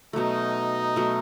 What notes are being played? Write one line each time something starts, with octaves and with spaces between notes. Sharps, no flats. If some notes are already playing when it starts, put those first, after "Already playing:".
B2 F#3 A3 D#4
B2 F#3 A3